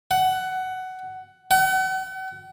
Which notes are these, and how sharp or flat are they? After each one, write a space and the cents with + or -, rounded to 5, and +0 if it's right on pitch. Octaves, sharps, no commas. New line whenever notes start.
F#5 +15
F#5 +40